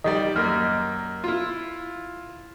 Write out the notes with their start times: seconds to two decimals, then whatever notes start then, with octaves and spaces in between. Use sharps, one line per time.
0.04 D#3 G3 D5 D#5
0.36 F#2 A#3 F6
1.24 E4 F4